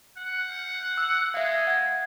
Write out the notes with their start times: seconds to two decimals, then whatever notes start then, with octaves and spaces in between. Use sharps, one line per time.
0.17 F#5
0.98 E6
1.34 G#3 E5 F5
1.67 F#5 G#6